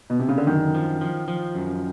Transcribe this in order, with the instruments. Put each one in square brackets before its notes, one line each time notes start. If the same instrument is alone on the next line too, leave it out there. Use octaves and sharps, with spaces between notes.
[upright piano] B2
C3
C#3
D3
[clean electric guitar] F#2 [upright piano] D#3
[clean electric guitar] F3
F3
F3
F#2